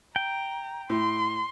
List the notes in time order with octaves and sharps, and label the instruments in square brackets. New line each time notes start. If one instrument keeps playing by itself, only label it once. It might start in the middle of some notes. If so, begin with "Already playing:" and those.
[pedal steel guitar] G5 [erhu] A#5
[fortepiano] A2 [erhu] C6